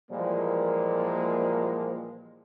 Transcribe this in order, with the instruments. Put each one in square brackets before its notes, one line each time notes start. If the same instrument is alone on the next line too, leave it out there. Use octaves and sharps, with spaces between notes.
[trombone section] A#2 E3 F3 G3 G#3 A#3